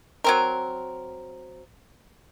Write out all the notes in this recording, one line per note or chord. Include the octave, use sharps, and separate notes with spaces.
F#3 C4 A#4